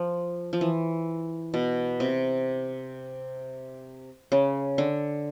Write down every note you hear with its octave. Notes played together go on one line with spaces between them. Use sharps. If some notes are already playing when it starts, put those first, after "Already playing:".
Already playing: F3
F3
E3
B2
C3
C#3
D3